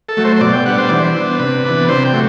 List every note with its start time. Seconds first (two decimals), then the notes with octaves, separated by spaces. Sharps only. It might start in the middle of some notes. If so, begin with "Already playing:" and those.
0.09 A4
0.17 F#3 A3
0.25 C5
0.36 C5
0.41 B2 D5
0.53 G5
0.65 G3 B3 D4 F#5
0.78 C5
0.89 E3 D5
0.99 C5
1.14 B3 D4
1.39 C3 B4
1.64 E3 B3 D4
1.89 C3 C5
2.05 G5
2.13 F#3 A3